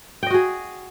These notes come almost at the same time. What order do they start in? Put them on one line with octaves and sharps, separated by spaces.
G5 D#5 F#4 G#4